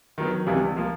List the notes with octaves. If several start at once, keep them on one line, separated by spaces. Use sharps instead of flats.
D#3 F#3 B3
C#2 C3 E3 G3
F3 A#3